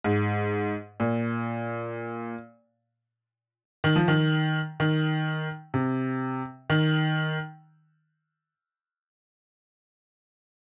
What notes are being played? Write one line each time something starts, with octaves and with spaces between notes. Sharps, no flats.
G#2
A#2
D#3
F3
D#3
D#3
C3
D#3